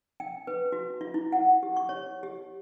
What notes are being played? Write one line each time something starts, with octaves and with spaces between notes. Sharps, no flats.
G5
B4
F#4
F4
E4
F#5
G4
C#6
C#5
G4